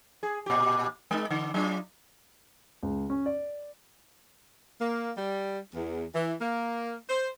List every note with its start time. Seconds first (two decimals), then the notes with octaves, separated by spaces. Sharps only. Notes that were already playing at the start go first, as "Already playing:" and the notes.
0.23 G#4
0.46 A#2 G4
1.11 G#3 D#4
1.30 D3
1.54 F#3 D4 F4
2.83 C#2
3.10 C#4
3.26 D5
4.81 A#3
5.17 G3
5.74 E2
6.15 E3
6.41 A#3
7.09 C5